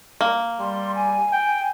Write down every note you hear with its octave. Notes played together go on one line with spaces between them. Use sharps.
A#3
G3 C6
G#5
G5